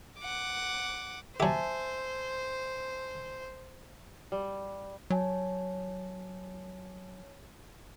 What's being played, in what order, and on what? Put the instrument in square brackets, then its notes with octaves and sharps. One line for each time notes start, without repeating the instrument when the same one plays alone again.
[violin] F#5 D6
[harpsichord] F#3 G4 [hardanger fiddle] C5 [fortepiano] E5 G#5 A5
[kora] G3
[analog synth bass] F#3 [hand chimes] C#5 G#5 A5